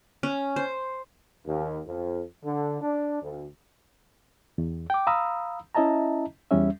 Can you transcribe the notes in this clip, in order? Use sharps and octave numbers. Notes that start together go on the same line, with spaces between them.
C#4
C5
D#2
F2
D3
D4
D2
E2
G5 D6
F5 A#5 B5 D#6 E6
C#4 E4 D#5 E5 A5 A#5
E2 G3 C#4 E5